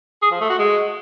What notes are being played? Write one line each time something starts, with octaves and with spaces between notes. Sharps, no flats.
G#4
F3
A3
F#4
G#3